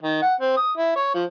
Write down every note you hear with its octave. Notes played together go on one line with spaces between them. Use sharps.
D#3
F#5
C4
D#6
E4
C#5
F3